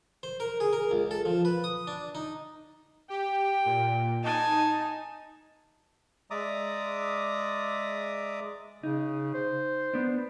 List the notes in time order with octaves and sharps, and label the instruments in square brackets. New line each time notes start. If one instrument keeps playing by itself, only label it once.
[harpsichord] C5
A#4
G#4
A#4
C#2
A4
F3
B4
D#6
D4
D#4
[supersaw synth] G4 [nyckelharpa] G5
[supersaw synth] A#2
[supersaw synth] D#4 [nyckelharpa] G#5 A5
[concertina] G#3 D5 E5 A#5 D6 D#6
[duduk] C#3 [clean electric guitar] D#4
[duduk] C5
[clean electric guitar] B3 D4